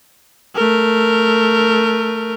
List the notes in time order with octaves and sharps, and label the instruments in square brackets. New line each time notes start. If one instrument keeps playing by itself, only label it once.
[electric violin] A3 A#4